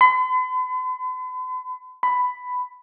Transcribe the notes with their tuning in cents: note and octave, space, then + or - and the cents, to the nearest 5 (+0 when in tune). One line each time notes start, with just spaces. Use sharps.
B5 +45
B5 +10